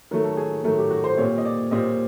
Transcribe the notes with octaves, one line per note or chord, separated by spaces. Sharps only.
D#3 F#3 A3
A4
G#4
D#3 F#3 A3
G4
F#4
C5
A#2 G3 C4 C#5
D#5
D5
A#2 G3 C4 D#5